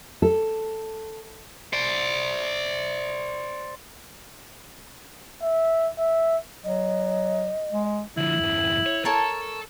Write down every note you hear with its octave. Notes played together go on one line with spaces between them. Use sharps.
A4
C5 D5
E5
E5
F#3 D#5
G#3
D3 F3 E4
E2 G2
C#5
A4 A#4 C#5 A5